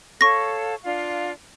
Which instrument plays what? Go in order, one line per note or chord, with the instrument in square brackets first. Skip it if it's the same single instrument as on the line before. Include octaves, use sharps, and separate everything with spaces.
[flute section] A4 C#5 F5 [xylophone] C#6 A#6
[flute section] D4 F4 F5